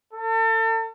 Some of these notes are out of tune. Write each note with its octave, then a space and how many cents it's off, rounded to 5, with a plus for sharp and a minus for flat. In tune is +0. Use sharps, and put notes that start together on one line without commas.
A4 +35